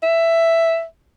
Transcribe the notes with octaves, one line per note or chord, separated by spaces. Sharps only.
E5